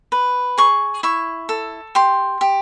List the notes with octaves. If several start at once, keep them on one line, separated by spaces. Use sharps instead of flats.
B4
G#4 C#6
E4 C#6
A4
G4 C6
G4